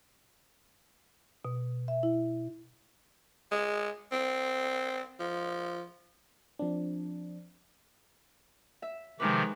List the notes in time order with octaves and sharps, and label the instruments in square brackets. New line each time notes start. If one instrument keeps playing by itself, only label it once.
[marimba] B2
E5
E4
[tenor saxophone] G#3
C4
F3
[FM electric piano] F3 C4 D4
[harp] E5
[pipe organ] C3 D#3 F3 [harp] G#3 D#4 B4 [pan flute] D6